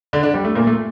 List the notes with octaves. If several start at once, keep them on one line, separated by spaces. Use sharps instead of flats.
D3 D4
D3 D4
G3
A3
A#2 A#3
A3